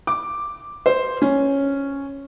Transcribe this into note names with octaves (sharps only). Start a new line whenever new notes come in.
D6
C5
C#4